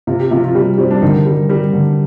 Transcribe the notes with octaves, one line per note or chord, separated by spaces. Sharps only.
C3 F4
G4
C3 F3 F4
F4
C3 G3 G4
G3 C4
D4
D3 D#3 D#4
G3
G3
D3